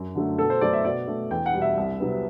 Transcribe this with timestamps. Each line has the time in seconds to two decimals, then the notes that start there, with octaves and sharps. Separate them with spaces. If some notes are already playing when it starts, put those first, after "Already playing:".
Already playing: F#2
0.15 D3 F#3 A3
0.39 B2 A4
0.50 C5
0.61 F#3 A3 D5
0.73 E5
0.85 B2 D5
1.07 A3
1.31 E2 G5
1.46 F#5
1.54 B2 G3
1.62 E5
1.77 C2
2.00 C3 F#3 B3